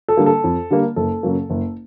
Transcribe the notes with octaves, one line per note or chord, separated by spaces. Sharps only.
A4
D3 G3 A#3
A4
F2
D3 G3 A#3
F#1 A4
F#2 C#3 F#3 A#3
F#1